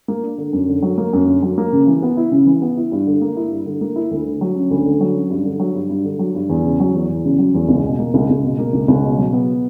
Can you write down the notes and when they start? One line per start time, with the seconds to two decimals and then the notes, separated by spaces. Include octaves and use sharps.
0.08 A#3
0.23 D4
0.38 D3
0.53 F#2
0.68 D3
0.82 F#3
0.98 A#3
1.13 F#2
1.28 D3
1.42 F#3
1.58 A#3
1.72 C#3
1.88 E3
2.02 B3
2.17 E4
2.31 C#3
2.46 E3
2.62 B3
2.77 E4
2.92 G2
3.07 D3
3.22 A#3
3.37 E4
3.51 G2
3.66 D3
3.81 A#3
3.96 E4
4.11 D2
4.26 D3
4.41 F#3
4.56 C#4
4.71 D2
4.85 D3
5.01 F#3
5.15 C#4
5.30 G2
5.45 D3
5.60 F#3
5.75 G2
5.90 G2
6.05 D3
6.19 F#3
6.35 G2
6.50 E2
6.64 C#3
6.80 F#3
6.94 E2
7.09 E2
7.24 C#3
7.38 F#3
7.54 E2
7.69 C#2
7.84 B2
7.99 A#3
8.14 C#2
8.29 C#2
8.44 B2
8.59 A#3
8.73 C#2
8.88 C#2
9.03 B2
9.18 F#3
9.33 B3